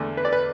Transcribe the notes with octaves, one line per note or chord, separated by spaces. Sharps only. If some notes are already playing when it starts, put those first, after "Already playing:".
Already playing: E2 D3 A3
B4
D5
B4